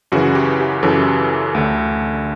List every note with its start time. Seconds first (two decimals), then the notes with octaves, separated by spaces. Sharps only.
0.12 F#2 C#3 E3 F#4
0.35 G4
0.60 G4
0.83 F#2 C#3 E3 A4
1.55 D2 D3